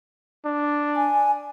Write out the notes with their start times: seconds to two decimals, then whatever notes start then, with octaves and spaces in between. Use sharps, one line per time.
0.45 D4
0.96 G#5